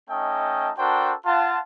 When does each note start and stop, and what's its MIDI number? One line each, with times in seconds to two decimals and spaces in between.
0.10 0.71 57
0.10 0.71 61
0.10 0.71 63
0.10 0.71 75
0.10 0.71 79
0.10 0.71 81
0.78 1.14 62
0.78 1.14 66
0.78 1.14 69
0.78 1.14 70
0.78 1.14 72
0.78 1.14 79
1.26 1.60 65
1.26 1.60 78
1.26 1.60 81